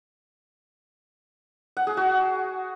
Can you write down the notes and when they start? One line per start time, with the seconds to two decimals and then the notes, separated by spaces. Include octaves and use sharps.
1.77 F#5
1.87 G#4
1.97 F#4